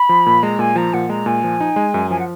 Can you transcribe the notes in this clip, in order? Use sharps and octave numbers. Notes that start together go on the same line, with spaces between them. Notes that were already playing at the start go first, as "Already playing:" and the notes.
Already playing: B5
F3
A#2
G#3 A#5
A#2 G#5
F3 A#5
A#2 F#5
G#3 A#5
A#2 G#5
F3
D#4
G#3
F#2
F3 G#5
F#5